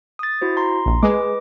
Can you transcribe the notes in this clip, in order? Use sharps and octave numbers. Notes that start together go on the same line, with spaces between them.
D#6 A6
E4 F#4 C5
A#5 C6
A#1
G#3 B4 D#5 D6